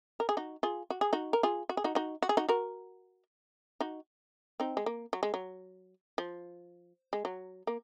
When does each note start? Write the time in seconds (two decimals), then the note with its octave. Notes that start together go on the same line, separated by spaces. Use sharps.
0.20 A#4
0.29 G#4
0.37 D#4 F#4
0.63 F4 G#4
0.90 F#4
1.01 G#4
1.13 D#4 F#4
1.33 A#4
1.43 F4 G#4
1.69 F#4
1.77 G#4
1.84 D#4 F#4
1.95 D#4 F#4
2.22 F#4
2.29 G#4
2.37 D#4 F#4
2.49 F#4 A#4
3.80 D#4 F#4
4.60 C4 D#4
4.77 G#3
4.86 A#3
5.13 F#3
5.23 G#3
5.34 F#3
6.18 F3
7.13 G#3
7.25 F#3
7.67 A#3